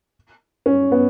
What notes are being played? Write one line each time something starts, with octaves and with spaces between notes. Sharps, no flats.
C#4
B3